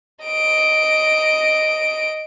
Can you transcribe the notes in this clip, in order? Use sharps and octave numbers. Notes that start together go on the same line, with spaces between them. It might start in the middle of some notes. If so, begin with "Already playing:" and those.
D#5 D7